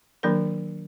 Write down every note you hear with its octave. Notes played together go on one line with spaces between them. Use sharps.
D#3 F#3 A#3 D4 A#4